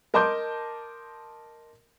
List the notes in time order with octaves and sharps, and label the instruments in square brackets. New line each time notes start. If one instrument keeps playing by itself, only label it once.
[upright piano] A#4 D#5 A5 C6 D6 G6